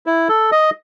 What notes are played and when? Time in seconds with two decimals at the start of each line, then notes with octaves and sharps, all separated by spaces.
0.06 E4
0.29 A4
0.52 D#5